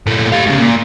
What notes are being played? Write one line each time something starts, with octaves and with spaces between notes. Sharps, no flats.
A#2 A3
G4 F5
G#2 C#3
A#2